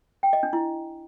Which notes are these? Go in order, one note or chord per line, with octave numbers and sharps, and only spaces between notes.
G5
D#5
D4
E4